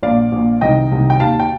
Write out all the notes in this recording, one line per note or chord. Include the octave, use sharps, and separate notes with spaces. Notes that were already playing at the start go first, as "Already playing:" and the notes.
A#1 A#2 D5 F5
A#1 A#2
C2 C3 D#3 D#5 G5
C2 C3 D#3
G5
D#2 D#3 F5 A5
G5